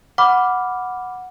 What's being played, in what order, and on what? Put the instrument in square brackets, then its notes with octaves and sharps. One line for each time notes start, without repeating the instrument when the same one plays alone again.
[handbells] F#5 [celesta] B5 D6 F6